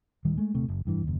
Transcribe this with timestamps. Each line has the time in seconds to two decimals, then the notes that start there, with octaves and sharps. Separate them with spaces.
0.25 D1 D#3 G3
0.38 G#3 A3
0.54 D#1 C3 A3
0.68 F#1
0.85 F1 G2 E3
1.03 F#1 D#2